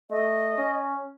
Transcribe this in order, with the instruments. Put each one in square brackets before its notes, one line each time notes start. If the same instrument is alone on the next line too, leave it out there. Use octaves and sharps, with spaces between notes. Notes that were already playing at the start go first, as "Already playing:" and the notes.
[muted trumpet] A3 [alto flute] D#5
[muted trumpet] C#4